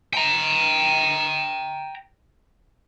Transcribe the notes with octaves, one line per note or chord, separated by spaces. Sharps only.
G5 A#5